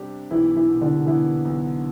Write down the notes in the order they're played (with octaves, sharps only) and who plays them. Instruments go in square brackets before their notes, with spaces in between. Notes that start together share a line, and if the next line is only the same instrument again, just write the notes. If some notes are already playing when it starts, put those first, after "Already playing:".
Already playing: [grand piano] C3 G3 D4 G4
[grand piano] B1 [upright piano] E3 E4
[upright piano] E3 E4
[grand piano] B2
[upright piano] D3 D4
[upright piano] E3 E4 [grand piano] B3
[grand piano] B1